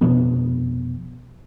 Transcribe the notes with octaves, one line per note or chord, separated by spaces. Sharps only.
F1 B2 F3 B3